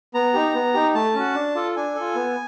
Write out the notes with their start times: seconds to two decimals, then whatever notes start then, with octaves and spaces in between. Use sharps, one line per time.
0.14 B3 A#5
0.34 D#4 G4
0.54 B3
0.74 D#4 G4
0.95 A3 A5
1.14 C#4 F#4
1.35 D4
1.55 F4 A4
1.76 D4 G#5
1.95 F4 A4
2.16 B3